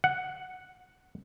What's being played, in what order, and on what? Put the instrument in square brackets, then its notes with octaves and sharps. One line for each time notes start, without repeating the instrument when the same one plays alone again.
[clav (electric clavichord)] F#5